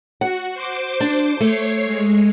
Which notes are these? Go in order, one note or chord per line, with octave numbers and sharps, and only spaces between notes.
F#4 F#5
C5 D6
D4
A3 C#5 C7
G#3